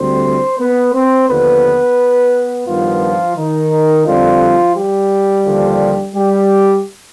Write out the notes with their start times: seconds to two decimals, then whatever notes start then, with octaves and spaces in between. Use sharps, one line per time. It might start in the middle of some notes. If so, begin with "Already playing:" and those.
Already playing: D2 D3 G3 C4 C5
0.59 B3 B4
0.93 C4 C5
1.28 D#2 D3 F3 B3 B4
2.67 G2 D#3 F3 B3 F4
3.36 D#3 D#4
4.05 F2 D3 F3 G3 C4 F4
4.75 G3 G4
5.45 D#2 D3 F3
6.14 G3 G4